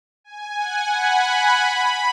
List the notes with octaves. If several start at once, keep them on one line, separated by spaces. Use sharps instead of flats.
G#5
F#5
B5
B5